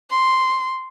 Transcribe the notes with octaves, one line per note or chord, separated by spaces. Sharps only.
C6